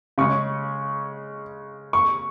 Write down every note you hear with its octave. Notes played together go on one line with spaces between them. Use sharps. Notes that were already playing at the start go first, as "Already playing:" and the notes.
C#3 G#3 C#4 C#6
C#6